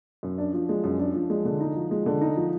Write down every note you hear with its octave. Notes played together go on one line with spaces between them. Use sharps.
F#2
D4
F3
G#3
F#2
D4
F3
G#3
D3
D#4
F3
G#3
D3
D#4
F3